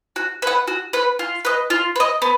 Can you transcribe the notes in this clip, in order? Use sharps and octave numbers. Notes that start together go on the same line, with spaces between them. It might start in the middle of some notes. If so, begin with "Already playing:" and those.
F#4
B4 F#5
F#4
B4 F#5
F4
B4 D#5
F4
B4
D#5
B3